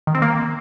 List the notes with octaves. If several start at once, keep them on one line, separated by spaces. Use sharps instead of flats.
D#3
C4
A#3